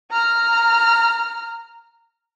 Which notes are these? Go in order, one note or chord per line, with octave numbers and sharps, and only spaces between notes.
A#5 F6